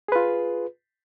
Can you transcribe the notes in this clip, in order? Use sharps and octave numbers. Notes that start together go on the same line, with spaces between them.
F4 G#4 B4